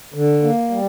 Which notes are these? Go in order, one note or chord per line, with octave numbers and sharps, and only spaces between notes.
D3
A#3
G3